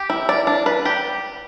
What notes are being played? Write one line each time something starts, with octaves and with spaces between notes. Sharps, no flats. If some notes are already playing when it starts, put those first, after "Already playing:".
Already playing: G4
E4
D5
D4
B4
G4